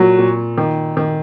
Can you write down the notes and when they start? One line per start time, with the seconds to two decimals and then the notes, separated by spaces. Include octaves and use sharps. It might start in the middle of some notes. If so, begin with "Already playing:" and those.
Already playing: A#2 F#3
0.18 A#2
0.58 D#3
0.97 D#3